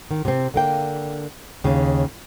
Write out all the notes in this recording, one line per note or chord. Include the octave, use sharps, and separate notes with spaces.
D#3
C3 C4
D3 A#3 G5
D#2 C#3